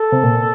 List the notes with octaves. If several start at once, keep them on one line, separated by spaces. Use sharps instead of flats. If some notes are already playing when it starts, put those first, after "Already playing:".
Already playing: A4
C3
A#2